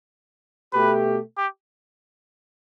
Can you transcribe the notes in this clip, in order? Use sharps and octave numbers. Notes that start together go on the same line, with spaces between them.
B2 A3 G4 B4
G4